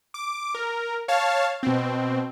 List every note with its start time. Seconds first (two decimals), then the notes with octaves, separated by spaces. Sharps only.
0.14 D6
0.55 A#4
1.08 C#5 F5 A5
1.63 B2 C4